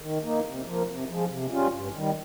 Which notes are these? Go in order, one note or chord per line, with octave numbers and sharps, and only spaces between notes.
D#3
A#3 D#4
C3
F3 A#3
C3
F3 G#3
C3
G3 C#4 F4
G2
D#3 G3